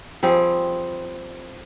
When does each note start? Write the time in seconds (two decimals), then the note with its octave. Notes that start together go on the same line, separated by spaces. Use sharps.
0.23 F3 G3 C4 G#4